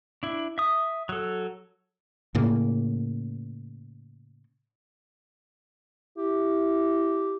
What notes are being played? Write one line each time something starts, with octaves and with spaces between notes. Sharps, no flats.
D4 E4
E5 D#6
F#3 A4
A2 C#3 A#3
E4 G4